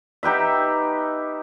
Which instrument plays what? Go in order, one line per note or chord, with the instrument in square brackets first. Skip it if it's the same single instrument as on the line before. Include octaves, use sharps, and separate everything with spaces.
[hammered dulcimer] D#4 G4 B4 E5